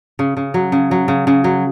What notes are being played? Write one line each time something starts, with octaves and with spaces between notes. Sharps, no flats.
C#3
C#3
F#3
C#3
F#3
C#3
C#3
F#3